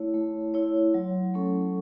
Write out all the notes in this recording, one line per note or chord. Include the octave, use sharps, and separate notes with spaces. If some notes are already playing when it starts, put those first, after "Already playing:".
Already playing: A3 E4 C#5
A3
E4 C#5
F#3
A3 C#4 A4